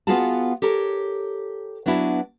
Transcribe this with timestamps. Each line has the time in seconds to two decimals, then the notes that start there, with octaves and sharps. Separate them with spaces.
0.07 B3 F4 F#4 G#4 F5 A5
0.62 G4 A4 A#4 C#5
1.86 F#3 B3 D4 E4 F#4